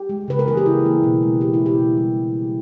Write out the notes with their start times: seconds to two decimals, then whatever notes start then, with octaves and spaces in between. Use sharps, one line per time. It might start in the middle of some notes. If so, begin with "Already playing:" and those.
Already playing: G4
0.09 G#3
0.28 C#3 B4
0.39 A#4
0.47 E3 A#3 G#4
0.57 G4
0.66 C#3 E4
0.84 E3 A#3
1.03 B2
1.23 G#3
1.41 B2 G4
1.54 E4
1.59 G#3
1.66 G4
1.79 B2
1.97 G3 A#3